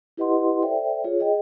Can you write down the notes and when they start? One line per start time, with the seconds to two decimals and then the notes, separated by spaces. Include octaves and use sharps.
0.17 E4 G4 B4 D#5 F#5 C6
0.62 A4 C5 D5 E5 G5
1.04 F4 G#4 C#5
1.19 G#4 D#5 G5